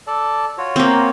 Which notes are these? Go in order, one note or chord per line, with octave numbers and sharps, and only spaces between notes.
A4 D5 A5
F4 F#4 C#5
A#3 C4